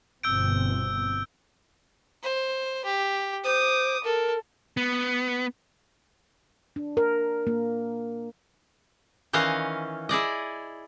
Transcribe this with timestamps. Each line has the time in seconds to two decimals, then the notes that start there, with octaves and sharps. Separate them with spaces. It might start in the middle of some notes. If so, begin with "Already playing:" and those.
0.23 G1 B2 C4 E6 G6 D7
2.23 C5
2.85 G4
3.44 C5 D6 D#6
4.04 A4 A#4
4.77 B3
6.76 D4
6.97 A#4
7.47 A#3
9.33 D#3 E3 C#4 D#5 F5
10.09 E4 G#4 D5 D#5